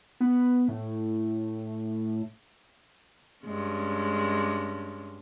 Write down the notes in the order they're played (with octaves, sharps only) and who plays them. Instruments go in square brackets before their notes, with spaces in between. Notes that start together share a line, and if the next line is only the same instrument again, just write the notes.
[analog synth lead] B3
A2
[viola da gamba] G2 G#3 C#4